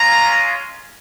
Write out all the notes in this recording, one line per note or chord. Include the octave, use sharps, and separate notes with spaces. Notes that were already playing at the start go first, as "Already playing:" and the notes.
Already playing: G#3 C#4 F4 A#5